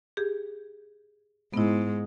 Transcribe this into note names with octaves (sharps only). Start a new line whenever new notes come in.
G4 G#4
G#2 B3 E4